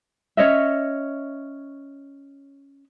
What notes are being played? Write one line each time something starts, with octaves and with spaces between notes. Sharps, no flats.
C#4 C#5 D#5 E5